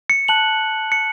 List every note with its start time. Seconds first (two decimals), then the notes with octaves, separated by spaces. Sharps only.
0.10 C#7
0.28 A5 F#6 F#7
0.92 C#7